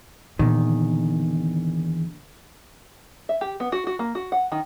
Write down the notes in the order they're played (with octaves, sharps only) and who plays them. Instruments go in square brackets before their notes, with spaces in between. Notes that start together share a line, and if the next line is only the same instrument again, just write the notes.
[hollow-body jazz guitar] E2 D#3 [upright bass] A#2 D3
[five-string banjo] E5
G4
B3
F#4
F#4
A#3
F#4
F#5
D#3